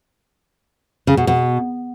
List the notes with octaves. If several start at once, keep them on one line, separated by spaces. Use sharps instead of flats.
C#3
B2
B2